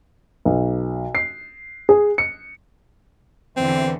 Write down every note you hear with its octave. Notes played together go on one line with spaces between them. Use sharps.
B1
C7
G#4
C#7
E2 D3 E3 C4